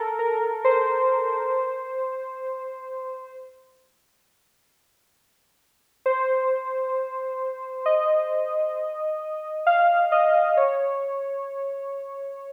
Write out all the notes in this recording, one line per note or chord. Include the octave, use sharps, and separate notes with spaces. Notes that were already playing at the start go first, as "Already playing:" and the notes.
Already playing: A4 A#4
A#4
C5
C5
D#5
F5
D#5
C#5